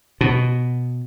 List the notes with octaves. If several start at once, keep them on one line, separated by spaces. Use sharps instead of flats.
B2